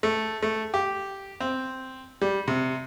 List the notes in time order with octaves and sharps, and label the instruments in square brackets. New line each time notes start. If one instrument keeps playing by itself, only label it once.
[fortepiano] A3
A3
G4
C4
G3
C3